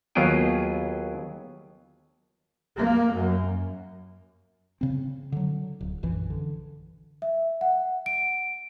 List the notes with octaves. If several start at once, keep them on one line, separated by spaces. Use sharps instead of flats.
D#2 F#3 B3 F4 G#4 G5
A#3
F#2
C#3 C4
D3 F#3
D1
A#1 F#2 E3
D3
E5
F#5
D7